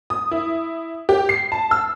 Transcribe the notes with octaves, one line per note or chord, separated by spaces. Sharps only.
D#6
E4
G4
C7
A5
E6